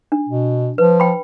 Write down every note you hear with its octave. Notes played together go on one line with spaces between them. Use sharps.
D4
B2
F3 B4
G5 B5